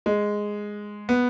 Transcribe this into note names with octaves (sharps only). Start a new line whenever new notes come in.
G#3
B3